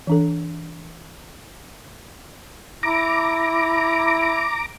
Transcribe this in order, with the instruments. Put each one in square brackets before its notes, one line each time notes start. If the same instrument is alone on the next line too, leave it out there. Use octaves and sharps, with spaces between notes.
[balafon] E3 D4 A4
[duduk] E4 [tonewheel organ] A#5 D6